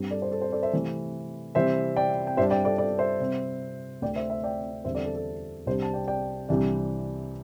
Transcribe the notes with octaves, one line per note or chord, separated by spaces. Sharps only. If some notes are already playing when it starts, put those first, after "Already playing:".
Already playing: G2 G3 C4
A4 D5
C5
A4
C5
A4 D5
C5 E5
C3 E3 A3 C4
C3 E3 G3 C4 C5 E5
D5 G5
G5
G2 G3 D4 C5 E5
D5 G5
A4 D5
A4 D5
C5 E5
C3 G3 C4
D2 C3 A3 D5 G5
C5 E5
C5 E5
D5 G5
E2 D3 G3 C4 C5 E5
A4 D5
A4
A4
C2 C3 G3 D4 C5
A5
D5 G5
D5 G5
C2 C3 E3 G3 D4